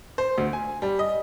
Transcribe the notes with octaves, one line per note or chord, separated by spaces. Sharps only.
C5
D2
G#5
G3
D#5